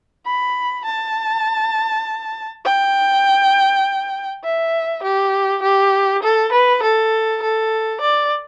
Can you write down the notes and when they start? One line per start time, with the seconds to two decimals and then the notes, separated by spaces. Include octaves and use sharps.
0.26 B5
0.85 A5
2.65 G5
4.44 E5
5.03 G4
5.62 G4
6.23 A4
6.52 B4
6.83 A4
7.42 A4
8.01 D5